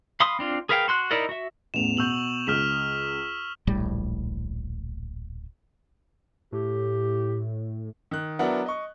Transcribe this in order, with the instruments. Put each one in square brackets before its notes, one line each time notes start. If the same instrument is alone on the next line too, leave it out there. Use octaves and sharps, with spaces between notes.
[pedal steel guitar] F5 B5 C6 D#6
C4 D4 F4
G#4 A#4 B4 F5 G5
F#4 C6 F#6
D#4 E4 A#4 D5 D#5
F#4 E5
[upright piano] A1 E2 [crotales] E7 F7
[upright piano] B2 G6 [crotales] C#6 E6 F#7
[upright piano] C#2 D#6 [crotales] F6 B6 E7
[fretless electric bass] D1 A#1 A2 G3
[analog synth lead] A2 [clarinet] G4
[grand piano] D#3 F#6
F#3 B3 D4 E4 A#4 F#5
D#5 C#6